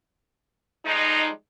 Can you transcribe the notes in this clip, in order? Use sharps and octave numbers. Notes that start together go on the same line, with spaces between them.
F3 G3 G#3 D#4